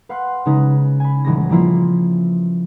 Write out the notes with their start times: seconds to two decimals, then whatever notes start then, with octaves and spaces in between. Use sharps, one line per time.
0.09 B4 F5 F#5 C6 F6 F#6
0.45 C#3 G#3 C#4 D#4 B4
1.00 G#5 B5
1.24 D#1 E3 G3 G#3 C#4 A#6
1.49 F3 G3 A#3 E4 F4